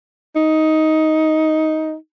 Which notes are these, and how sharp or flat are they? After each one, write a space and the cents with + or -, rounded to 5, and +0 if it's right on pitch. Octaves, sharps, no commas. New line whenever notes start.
D#4 +10